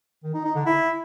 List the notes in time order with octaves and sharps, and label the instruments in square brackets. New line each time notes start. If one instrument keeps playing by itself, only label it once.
[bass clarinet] D#3
D#4
D#4
D3
E4